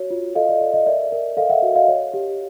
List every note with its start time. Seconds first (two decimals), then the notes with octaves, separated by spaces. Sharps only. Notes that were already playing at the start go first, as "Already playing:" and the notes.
Already playing: F#4 C#5
0.10 F4
0.35 A4 D#5 F5
0.49 D5
0.61 A4 D5
0.73 D#5
0.86 A#4 D5 E5
1.12 A#4
1.37 A4 D#5 F5
1.49 E5 F#5
1.62 F#4 D#5
1.75 D#5 F5
1.88 C#5
2.14 G4